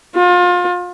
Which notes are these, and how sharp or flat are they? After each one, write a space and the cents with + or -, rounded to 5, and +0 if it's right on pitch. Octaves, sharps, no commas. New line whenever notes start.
F4 +30